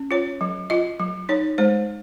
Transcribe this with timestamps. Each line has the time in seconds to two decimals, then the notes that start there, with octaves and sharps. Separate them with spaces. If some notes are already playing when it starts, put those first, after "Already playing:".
Already playing: C#4
0.11 F4 C#5
0.41 F#3
0.70 F4 D#5
0.99 F#3
1.29 D#4 C#5
1.58 G#3 C5